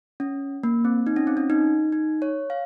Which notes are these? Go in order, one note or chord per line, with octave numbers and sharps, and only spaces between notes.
C#4
A#3
C4
D#4
C#4
C4
C#4
D#4
D#4
C#5
F5